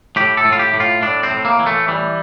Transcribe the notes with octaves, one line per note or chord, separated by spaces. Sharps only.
A2 G4
A4
A2
F4
G4
A2
F4
A2 D4
C4
A2
A#3
E3
A3
E3 G3